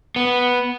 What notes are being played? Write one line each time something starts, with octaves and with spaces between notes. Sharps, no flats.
B3